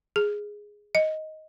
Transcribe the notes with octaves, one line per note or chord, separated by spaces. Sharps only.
G#4
D#5